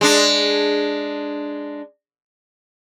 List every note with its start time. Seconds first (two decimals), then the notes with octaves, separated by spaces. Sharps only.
0.01 G#3 D4